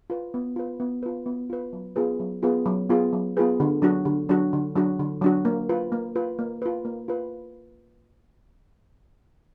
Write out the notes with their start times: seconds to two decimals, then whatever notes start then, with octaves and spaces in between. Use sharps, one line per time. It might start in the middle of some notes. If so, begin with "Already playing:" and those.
0.10 F4 B4
0.34 B3
0.56 F4 B4
0.80 B3
1.03 F4 B4
1.26 B3
1.50 F4 B4
1.73 F#3
1.96 B3 F4 G#4 B4
2.20 F#3
2.43 B3 F4 G#4 B4
2.66 F#3
2.89 B3 F4 G#4 B4
3.13 F#3
3.37 B3 F4 G#4 B4
3.60 D3
3.82 F#3 D4 F#4
4.05 D3
4.29 F#3 D4 F#4
4.53 D3
4.76 F#3 D4 F#4
5.00 D3
5.22 F#3 D4 F#4
5.45 A#3
5.69 F4 B4
5.92 A#3
6.16 F4 B4
6.39 A#3
6.62 F4 B4
6.85 A#3
7.08 F4 B4